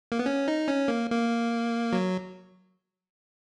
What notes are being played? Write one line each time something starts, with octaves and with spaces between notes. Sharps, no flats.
A#3
B3
C#4
D#4
C#4
A#3
A#3
F#3